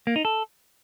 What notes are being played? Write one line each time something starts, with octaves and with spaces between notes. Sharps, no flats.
A#3
D#4
A4